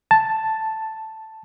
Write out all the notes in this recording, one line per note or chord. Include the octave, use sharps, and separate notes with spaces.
A5